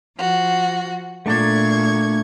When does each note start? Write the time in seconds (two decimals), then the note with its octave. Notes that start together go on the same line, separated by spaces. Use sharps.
0.17 F3 F#4
1.26 A#2 A3 D4 A5 C#6 G#6